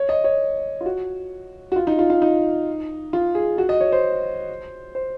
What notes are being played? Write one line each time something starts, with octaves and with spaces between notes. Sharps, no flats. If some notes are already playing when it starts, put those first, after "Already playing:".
Already playing: C#5
D#5
C#5
F4
F#4
F#4
F4
D#4
F4
F4
D#4
F4
G#4
F#4
D#5
C#5
C5
C5